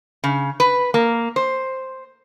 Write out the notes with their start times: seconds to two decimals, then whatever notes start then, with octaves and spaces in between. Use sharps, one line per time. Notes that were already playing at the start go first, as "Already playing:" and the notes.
0.24 C#3
0.60 B4
0.94 A#3
1.36 C5